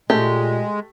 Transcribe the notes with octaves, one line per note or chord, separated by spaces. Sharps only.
A#2 G#3 A3 G4